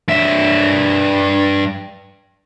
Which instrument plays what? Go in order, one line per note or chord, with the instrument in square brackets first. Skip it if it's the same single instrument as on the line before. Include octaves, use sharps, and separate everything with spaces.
[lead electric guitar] G2 E5